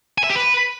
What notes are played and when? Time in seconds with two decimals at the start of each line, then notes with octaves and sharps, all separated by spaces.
0.18 G#5
0.24 E5
0.30 G4
0.36 B4